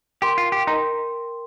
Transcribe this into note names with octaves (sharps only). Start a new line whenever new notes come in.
G4 A#4 G5 C6
F4
G4
D#4 A#4 G5 C6